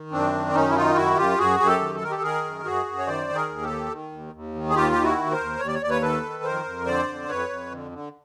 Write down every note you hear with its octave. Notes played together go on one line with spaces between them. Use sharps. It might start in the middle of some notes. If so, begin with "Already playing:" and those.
Already playing: D#3
F#2 C4 D4
D#3
F#2 C#4 D#4
E4
D#3 D#4 F4
F#2 E4 F#4
F#2 F4 G4
F#2 F#4 G#4
F#2 G#4
G4 A4
D#3
A4
D#3 A#4
G4 A4
D#3 G#4 A#4
F#2
F#2 F#4 G#4
F#2
C#5
D#3 C5 D5
D#3
G#4 A#4
D#2
G4 A4
D#3
D#3
D#2
D#2
D#3
G#4
D#2 F4 G4
D#3 G4
E4 F#4
D#2
A#4 C5
D#2
D#2 C#5
D5
C#5
D#2 D5
B4 C#5
D#3 A4 B4
D#3
F2 A#4 C5
F2
D3 C5 D5
F2
F2 B4 C#5
F2
D3
D3